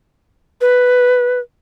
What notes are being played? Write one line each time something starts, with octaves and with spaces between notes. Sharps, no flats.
B4